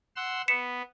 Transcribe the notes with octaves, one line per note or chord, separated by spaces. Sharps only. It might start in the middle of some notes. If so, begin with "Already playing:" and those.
F#5 C6 E6
B3 B6 C#7 E7